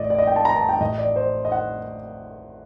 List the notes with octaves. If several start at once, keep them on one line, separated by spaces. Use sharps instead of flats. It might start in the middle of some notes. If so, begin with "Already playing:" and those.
Already playing: A1 A2 D5 D#5
D5
D#5
G5
A5
A#5
A5
G5
A1 A2 D#5
D5
C5
D#5
F#5